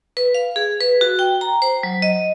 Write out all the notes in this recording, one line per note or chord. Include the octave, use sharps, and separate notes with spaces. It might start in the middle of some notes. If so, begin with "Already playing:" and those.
B4
F5
G#4
B4
F#4
G5
A#5
C5
F#3
D#5